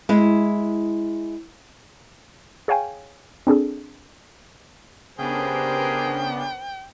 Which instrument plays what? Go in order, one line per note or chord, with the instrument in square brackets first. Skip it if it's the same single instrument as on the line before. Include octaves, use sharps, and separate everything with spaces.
[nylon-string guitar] G#3 E4
[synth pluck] G#4 C#5 F5 G5 G#5
C4 D4 G#4 A4
[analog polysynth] C#3 B3 D4 [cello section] G4 A#4 C5 [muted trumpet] G#4 [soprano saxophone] G5